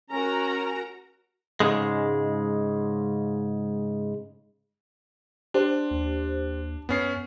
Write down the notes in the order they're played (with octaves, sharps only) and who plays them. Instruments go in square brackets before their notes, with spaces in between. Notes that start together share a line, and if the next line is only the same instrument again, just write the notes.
[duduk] C#4 [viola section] F#4 A#4 A#5
[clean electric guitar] G#2 C#3 G#3
[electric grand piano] D4 [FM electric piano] G4 C5
[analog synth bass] D#2
[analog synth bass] F#2 [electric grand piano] B3 C#4 C7